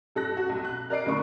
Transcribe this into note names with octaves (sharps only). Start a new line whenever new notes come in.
G2 A4 F#6 A#6
F#4
B1
F#6
A#4 D5 D#5 C7 D7
F#1 D3 A3 A#3 C#6